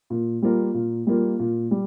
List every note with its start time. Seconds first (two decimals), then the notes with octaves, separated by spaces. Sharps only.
0.10 A#2
0.42 G3 A#3 F4 A#4
0.74 A#2
1.07 G3 A#3 F4 A#4
1.39 A#2
1.71 G3